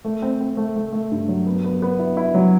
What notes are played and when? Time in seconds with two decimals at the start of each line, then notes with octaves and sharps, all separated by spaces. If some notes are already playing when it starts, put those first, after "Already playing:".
0.05 A3
0.22 C4
0.41 C4
0.57 A3
0.76 A3
0.93 A3
1.11 G2
1.29 F#3
1.46 B3
1.65 B3
1.82 B3
1.99 E4
2.17 E4
2.34 F#3